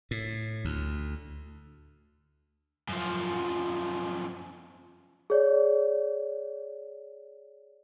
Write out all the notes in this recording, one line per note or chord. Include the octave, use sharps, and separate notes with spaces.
A2
D2
F#2 F3
G#4 C#5 D5